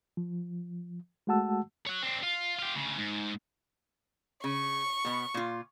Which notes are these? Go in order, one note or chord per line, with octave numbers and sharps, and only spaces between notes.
F3
G#3 A3 F#4 F#5 A5 E6
C#5 F#5
C4 D4
F4
F4 G4
D2 C#3
G#2
C#3 C#6
B2 B3
A#2 F4